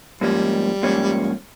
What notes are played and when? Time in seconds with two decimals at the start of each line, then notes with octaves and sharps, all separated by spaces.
0.21 G#2 F3 G3 A#3 C#4
0.83 G#2 F3 A#3 C#4